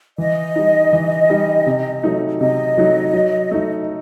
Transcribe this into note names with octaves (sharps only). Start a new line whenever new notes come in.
E3 D#5
G3 D#4
E3
G3 D#4
C3
F#3 A3 D#4
C3 D#5
F#3 A3 D#4
F#3
A3 D#4